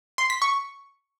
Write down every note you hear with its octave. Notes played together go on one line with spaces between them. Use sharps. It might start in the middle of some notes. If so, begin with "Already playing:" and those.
C6
B6
C#6